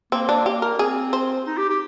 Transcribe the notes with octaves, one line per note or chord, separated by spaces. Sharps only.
A#3 C4
D4
G4
A#4
C4 G#4
C5
D#4
G4
G4